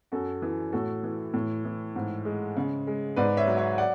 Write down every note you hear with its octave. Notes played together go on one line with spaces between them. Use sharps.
F#2 F#4 A4
E3
A2 F#4 A4
E3
A2
E3
G#2
G#3
C#3
G#3
G#2 B4 D5
C#5 E5
F#3
C#5 E5
D5 F#5